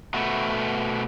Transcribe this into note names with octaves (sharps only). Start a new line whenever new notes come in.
B2 A3 B3